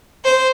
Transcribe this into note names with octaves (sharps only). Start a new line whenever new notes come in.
C5